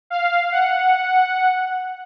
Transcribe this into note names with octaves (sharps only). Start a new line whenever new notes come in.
F5
F#5